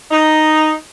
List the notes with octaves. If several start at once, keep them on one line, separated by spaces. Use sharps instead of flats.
D#4